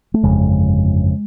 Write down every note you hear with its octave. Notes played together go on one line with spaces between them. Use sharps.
A3
G1 F2 C#3 G#3